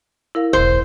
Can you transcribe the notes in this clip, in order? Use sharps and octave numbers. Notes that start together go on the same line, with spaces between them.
E4 A#4 F5
E1 B1 C5